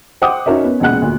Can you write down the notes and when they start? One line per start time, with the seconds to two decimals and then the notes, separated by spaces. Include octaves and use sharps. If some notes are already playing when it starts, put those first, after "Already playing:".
0.22 C5 F#5 G5 D6 D#6
0.46 C#4 D#4 F#4 A#4 C#5 E5
0.64 B3 C#4 B4
0.80 E1 A#2 C#3 F#5 F#6
1.02 D2 A#2